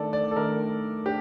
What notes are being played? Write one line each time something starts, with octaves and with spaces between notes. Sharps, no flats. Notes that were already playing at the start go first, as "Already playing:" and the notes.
Already playing: D#3 A3 D4 A4 D5
D5
A4
D#3 A3 D4 A#4
D4 G4